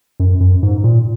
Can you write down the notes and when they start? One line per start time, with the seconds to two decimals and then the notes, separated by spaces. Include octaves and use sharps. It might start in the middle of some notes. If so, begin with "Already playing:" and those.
0.20 F#2
0.40 F#2
0.63 G#2
0.84 A#2